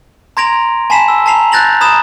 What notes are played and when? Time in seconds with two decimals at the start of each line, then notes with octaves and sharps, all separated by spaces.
0.37 A#5 C6 G#6 A#6 D7 F7
0.90 G#5 A5 B5 B6 C7 E7
1.08 E6
1.26 A5 A#5 C7 F7
1.52 F#6 G6 A6 A#6 F7 F#7
1.81 A#5 B5 D#6 G#6 E7